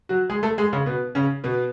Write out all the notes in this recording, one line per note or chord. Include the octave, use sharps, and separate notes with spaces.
F#3 F#4
G#3 G#4
A3 A4
G#3 G#4
C#3 C#4
B2 B3
C#3 C#4
B2 B3